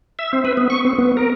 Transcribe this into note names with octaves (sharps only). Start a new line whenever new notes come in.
E5
C4
B4
B3
C#6
C4
B3
A#4